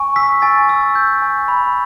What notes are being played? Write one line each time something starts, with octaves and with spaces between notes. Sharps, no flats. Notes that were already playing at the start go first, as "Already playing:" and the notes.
Already playing: G#5 C#6
E6 B6
G#5 A6
E6
G6
G#5
B5